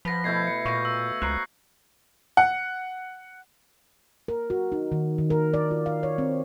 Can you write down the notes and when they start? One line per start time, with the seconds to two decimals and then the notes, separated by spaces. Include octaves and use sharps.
0.05 F3 B4 F#5 A#6 B6
0.24 B2 A3 E4 G6 G#6 C7
0.47 C#7
0.66 A#2 F5 C#6 A#6
0.85 E6
1.22 C#2 C5 A#5 F#6 C7
2.37 F#5
4.28 A#4
4.50 F#4
4.72 D#4
4.92 D#3
5.18 D#3
5.30 A#4
5.54 D5
5.71 F4
5.86 F5
6.03 C#5
6.18 C4